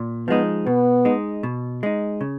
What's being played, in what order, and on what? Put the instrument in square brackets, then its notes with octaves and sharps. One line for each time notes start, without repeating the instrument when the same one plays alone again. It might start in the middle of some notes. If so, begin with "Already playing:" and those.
Already playing: [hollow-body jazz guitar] A#2
[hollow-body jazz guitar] F3 G#3 D#4 [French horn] B3
[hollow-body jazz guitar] B2 [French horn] B3
[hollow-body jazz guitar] G#3 D#4
B2
G#3 D#4
C#3